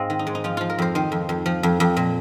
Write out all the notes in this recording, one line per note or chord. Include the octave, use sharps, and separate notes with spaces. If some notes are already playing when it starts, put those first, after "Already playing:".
Already playing: G#2 C4 D#5 F5
D#3
D#4
G#2
D#4
F3 F4
F3 F4
A#4
F2 C5
D#3 C5
F2
F2
F3
F2
F2
A#2